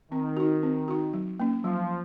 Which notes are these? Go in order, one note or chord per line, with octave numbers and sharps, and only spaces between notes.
D#3 C4
D#4 F#4
C4
D#4 F#4
F#3
A#3 C#4
F3 F#3